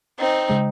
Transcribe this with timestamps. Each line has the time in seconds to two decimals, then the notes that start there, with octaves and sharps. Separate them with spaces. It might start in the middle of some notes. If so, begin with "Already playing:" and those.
0.19 C4 D#4
0.50 C#3 G#3